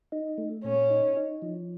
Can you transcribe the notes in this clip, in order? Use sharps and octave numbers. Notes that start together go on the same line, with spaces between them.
D#4
A3
A#2 C#4
D#4
D#4
F3